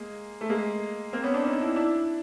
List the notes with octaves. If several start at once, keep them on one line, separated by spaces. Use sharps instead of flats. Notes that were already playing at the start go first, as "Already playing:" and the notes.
Already playing: G#3 A#3
A3
G#3 A#3
A#3 C4
B3 C#4
C4 D4
C#4 D#4
D4 E4
D4 E4